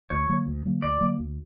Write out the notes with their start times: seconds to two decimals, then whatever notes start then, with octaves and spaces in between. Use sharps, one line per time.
0.10 D2 C#5
0.29 D3 F#3 A#3
0.47 D2
0.65 D3 F#3 A#3
0.82 D2 D5
1.01 D3 F#3 A#3
1.19 D2